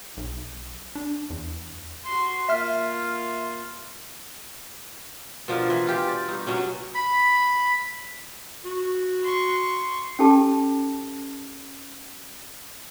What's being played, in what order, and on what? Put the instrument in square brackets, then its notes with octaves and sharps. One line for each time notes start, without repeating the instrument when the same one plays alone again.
[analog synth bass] B1
D4
E2
[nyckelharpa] F#4 C6
[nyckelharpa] A#3 F4 [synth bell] E5 F6
[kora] B2 F3 D4 A#4
E3
F4 G4
D5
G2 D#4
B2 F#3 C#4
[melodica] B5
[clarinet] F#4
[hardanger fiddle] C6 C#6
[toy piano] C#4 D#4 G4 A4 A5